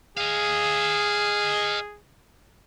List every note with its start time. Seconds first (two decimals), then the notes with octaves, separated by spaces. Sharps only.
0.17 G#4 D#5 F5